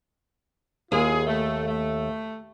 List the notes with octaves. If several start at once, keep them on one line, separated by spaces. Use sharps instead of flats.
D#2 E4 F4 G#4
A3
A3